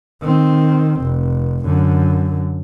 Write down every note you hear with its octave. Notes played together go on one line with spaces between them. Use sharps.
D#3 C4
F1
F#2 D3